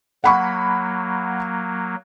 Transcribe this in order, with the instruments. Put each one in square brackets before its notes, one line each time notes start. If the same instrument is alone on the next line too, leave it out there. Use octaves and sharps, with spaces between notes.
[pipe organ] F#3 A#3 [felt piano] F#5 B5 C#6